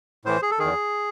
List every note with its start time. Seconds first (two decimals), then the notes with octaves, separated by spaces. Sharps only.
0.25 A2 E3 C5
0.42 G#4
0.51 A4
0.59 E2 D#3 G#4